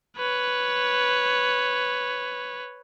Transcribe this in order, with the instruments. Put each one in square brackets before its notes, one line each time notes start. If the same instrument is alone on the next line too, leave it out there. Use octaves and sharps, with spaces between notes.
[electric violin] B4 C#5